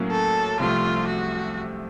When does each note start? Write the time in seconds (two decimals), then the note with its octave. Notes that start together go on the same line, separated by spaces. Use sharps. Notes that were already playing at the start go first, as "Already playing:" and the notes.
Already playing: A2 F#3 A#3 C#4
0.11 A4
0.60 C2 C3 F3 A3 F4
1.07 F#4